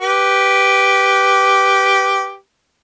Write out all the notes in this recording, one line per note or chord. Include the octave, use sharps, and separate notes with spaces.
G4 B4